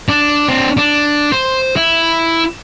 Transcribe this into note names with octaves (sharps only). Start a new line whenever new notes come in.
D4
C4 D4
D4
C5
E4